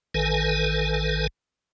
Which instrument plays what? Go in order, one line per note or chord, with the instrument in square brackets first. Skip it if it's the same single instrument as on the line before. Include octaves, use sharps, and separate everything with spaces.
[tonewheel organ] A1 D#3 A4 B4 G#5